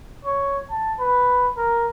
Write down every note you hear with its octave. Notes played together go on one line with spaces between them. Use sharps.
C#5
A5
B4
A#4